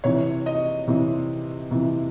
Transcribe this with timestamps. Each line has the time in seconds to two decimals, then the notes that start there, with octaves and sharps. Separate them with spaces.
0.04 C3 E3 C#5
0.46 D#5
0.88 C3 E3
1.71 C3 E3